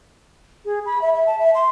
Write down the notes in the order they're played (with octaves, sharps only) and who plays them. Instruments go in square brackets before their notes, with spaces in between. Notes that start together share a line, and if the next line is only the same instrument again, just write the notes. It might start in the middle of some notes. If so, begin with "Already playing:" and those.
[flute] G#4
B5
E5
E5
A5
E5
C6